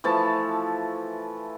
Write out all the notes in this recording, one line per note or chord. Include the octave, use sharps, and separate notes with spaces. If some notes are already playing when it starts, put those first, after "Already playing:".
E3 F3 A3 A5